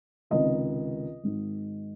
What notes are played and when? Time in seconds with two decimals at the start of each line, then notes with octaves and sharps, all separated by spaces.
0.30 C#2 C3 D#3 D#5
1.24 G#1 G#2 D#3